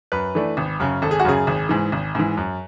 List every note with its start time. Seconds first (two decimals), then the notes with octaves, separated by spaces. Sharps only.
0.12 F#2 B4
0.35 E3 A3 D4
0.57 G#1
0.80 F#2 C#3
1.02 G#1 A4
1.11 G#4
1.20 F#4
1.25 F#2 C#3 G#4
1.47 G#1
1.69 G#2 E3
1.92 G#1
2.15 G#2 E3
2.37 F#2